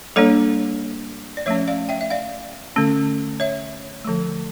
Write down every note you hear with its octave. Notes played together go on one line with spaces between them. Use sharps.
G3 A#3 D4 A4 C#5
D5
F3 A3 C#4 C#5 E5
D5 F5
E5 G5
E5
D5 F5
D3 A3 C#4
C#5 E5
D3 F3 A3